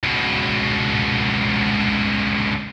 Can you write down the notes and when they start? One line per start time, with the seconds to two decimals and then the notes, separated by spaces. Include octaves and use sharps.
0.04 C#2 B2